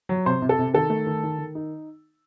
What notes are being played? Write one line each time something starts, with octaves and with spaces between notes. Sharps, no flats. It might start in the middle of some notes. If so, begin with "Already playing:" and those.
F#3
C3 C5
C3
A4
C3
D#3 A4
A3
D#3
D#3
D#3
D#4